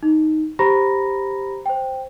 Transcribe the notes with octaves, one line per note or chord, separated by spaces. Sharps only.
D#4
G4 C5 A#5 B5 A#6
C5 G5